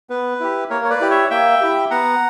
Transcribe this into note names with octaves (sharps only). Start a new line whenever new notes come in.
B3 B4
E4 G4
A#3 A#4 C#5
C#5
B4 D5
E4 G4
C#5 E5
A#3 E5 G5
E4 G4
B3 F#5 A#5